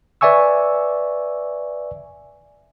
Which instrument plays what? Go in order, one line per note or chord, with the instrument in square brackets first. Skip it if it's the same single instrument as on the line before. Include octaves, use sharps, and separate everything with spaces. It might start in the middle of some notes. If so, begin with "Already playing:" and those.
[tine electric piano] B4 D5 E5 G#5 C#6 E6